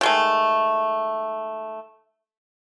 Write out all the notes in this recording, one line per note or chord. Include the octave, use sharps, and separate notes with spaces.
D#3 G#3 A3